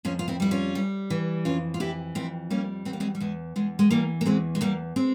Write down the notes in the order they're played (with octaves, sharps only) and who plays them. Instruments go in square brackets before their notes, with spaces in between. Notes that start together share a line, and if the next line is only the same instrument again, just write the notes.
[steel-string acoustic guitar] F2 C#4 F4
F4
C4 E4
G3 E4
C#4 F4
G3
E3
F2 C#4 F4
F4
E3 E4 G4
F2 C4 E4
G3 A#3 C#4
E2 C4
A#3
G#3 C4
G3
E2 G#3
E2 G#3
G#3
E3 G3 A#3
A#3
E2 G#3 C4
G#3
E2 G3 A#3
G#3 C4